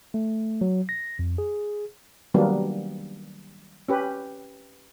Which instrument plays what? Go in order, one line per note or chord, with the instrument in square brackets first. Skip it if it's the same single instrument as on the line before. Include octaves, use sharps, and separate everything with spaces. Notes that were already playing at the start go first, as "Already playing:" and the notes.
[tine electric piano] A3
F#3
A#6
F2
G#4
[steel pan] D#3 F#3 G3 A#3 B3 D4
C#4 G4 B4